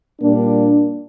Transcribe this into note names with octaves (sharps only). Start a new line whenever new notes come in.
A#2 G3 A#3 D4